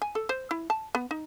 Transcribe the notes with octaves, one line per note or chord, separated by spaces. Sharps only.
G#5
A4
C5
E4
A5
B3
D#4